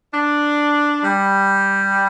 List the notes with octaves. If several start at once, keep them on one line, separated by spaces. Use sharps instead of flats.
D4
G3